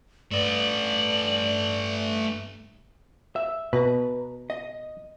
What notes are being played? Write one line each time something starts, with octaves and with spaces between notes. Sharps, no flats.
G2 A3 B4 D5 F#7
E5
B2 B4 A#5
D#5